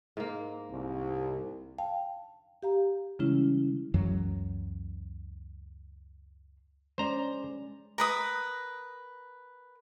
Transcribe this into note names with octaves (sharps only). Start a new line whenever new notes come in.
G#2 A#3
C2
F5 G5 A5
G4 F5 A#5
C#3 E3 G3 G#3 C#4 E4
C#2 F#2 E3 F#3
G#3 C#4 C5 D5 A#5
A#4 B4 D#6